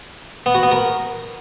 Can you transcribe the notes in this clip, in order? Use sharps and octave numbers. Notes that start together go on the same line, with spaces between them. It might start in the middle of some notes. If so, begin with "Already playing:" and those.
B3
F#4
B3
A#4